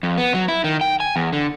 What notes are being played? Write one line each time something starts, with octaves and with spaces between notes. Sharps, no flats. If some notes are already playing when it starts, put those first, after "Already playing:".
F2
B3
F#3
E4
D#3
G5
G#5
E2
D3